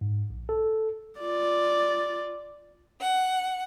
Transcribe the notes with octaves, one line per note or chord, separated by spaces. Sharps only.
G#2
A#1
A4
F4 D5
F#5